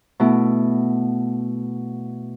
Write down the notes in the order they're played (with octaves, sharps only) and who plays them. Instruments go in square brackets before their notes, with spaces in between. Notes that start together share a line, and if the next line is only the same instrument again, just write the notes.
[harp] B2 A3 E4